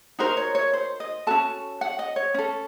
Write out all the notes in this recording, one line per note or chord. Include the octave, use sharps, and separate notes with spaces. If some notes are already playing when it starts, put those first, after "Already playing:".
D#4 F#4 A#4 C5
C#5
C#5
C5
D#5
C#4 F#4 A4 A5
F#5
D#5
C#5
C#4 A4